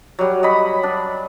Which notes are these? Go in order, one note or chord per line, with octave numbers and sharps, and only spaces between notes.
F#3 G3
D#5 B5
D4